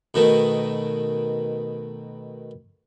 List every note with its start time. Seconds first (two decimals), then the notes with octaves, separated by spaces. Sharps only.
0.14 B2 D#3 A3